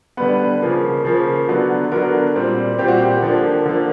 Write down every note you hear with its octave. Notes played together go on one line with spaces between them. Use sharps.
D3 G3 B3 B4
C#3 F3 A#3
C#3 F3 A#3
D3 F#3 B3
D3 F#3 B3 A#4
A#2 G3 C4
A#2 G3 C4 G4
F#4
G4
D3 F3 A#3
D3 F3 A#3